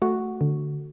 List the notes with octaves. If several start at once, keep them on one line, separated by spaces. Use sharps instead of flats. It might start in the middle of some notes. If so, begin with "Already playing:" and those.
A3 F#4
D3